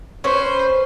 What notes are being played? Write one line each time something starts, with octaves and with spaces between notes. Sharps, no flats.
C#4 B4 C5